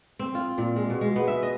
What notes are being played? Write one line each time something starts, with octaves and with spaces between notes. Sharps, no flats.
C4
F4
A#2
G#3
B2
G#3
B3
E5
D#5